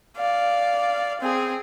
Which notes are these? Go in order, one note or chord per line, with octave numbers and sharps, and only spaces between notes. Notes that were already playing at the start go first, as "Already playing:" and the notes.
D5 F5
C4 G#4